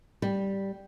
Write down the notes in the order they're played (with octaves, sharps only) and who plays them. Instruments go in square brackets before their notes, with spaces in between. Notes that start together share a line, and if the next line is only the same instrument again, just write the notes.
[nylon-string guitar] G3